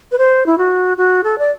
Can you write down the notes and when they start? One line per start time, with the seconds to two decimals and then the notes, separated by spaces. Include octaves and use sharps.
0.12 B4
0.18 C5
0.46 E4
0.58 F#4
0.98 F#4
1.24 A4
1.38 D5